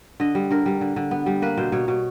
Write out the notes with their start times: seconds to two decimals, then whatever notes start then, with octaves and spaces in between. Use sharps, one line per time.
0.20 D3 D#5
0.35 G3
0.51 D3 A#4
0.66 G3
0.81 D3
0.96 D3
1.11 B3
1.26 G3
1.42 A#3 B4
1.57 B2 C5
1.72 B2 C#5
1.88 B2